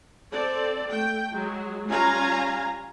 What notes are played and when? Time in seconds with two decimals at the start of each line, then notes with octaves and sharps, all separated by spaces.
0.31 C4 A4 D5
0.89 A3 G5
1.32 F#3 G#3
1.88 G3 C#4 F4 F5 G#5 A#5